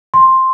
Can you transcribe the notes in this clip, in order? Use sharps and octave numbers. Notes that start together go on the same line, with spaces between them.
C6